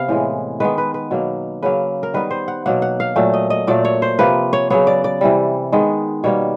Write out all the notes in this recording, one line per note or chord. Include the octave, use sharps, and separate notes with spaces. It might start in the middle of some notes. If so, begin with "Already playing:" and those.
Already playing: C3 B3 F5
A2 E3 G#3
D#3 G#3 B3 B4
B4
B4
B2 F#3 A#3
C#3 F#3 A#3 B4
A#4
D#3 G3 B3 B4
C5
F#5
B2 F#3 A#3 F#5
F#5
F5
A#2 F#3 A3
D#5
D#5
A#2 F#3 A3 D5
C#5
C5
C3 F3 A#3 B4
C#5
C#3 F#3 B3 C#5
D5
D5
C3 E3 G3
D#3 G#3 B3
B2 G3 A#3 C#5